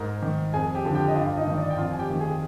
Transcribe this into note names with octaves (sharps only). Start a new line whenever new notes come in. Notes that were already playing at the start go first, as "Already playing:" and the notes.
Already playing: G#2 A#4 A#5
D#3
F2 G#4 G#5
G4 G5
D3 F3
G4 G5
D#5
G2 F4 F5
D#4 D#5
D#3
D5
G5
F2 F4 F5
G#5
G4 G5
D#3
G#4 G#5